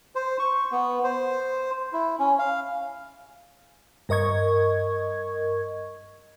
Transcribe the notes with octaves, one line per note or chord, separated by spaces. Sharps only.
C5
C#6
B3
C5
E4
C#4
F5
G2 A#4 D#5 C#6 G#6